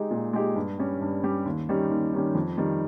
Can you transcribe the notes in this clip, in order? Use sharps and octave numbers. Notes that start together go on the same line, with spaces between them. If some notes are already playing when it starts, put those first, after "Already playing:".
Already playing: G#3 D#4 G4
A#2
G#3 D#4 G4
G2
G3 C#4 G4
G2
G3 C#4 G4
D#2
D#3 G3 C#4 G4
D#2
D#3 G3 C#4 G4
F2
D#3 G3